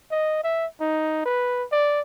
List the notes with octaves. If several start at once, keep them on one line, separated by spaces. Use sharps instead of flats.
D#5
E5
D#4
B4
D5